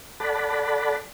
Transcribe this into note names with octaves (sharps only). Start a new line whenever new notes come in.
A4 D5 F#5 A5 B5